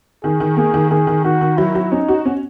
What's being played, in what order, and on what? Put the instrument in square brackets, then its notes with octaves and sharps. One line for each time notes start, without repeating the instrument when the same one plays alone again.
[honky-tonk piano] D#3 [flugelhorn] G#4
[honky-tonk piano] D#3
[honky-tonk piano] A#3 [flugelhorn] G#4
[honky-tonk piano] D#3
[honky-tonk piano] D#3 [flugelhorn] G#4
[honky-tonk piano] D#3
[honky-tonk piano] D#3 [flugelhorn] F#4
[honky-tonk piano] D#3
[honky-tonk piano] F#3 [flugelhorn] E4
[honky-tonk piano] F#3
[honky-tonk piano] C#4 [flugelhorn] D#4
[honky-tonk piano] F#4
C#4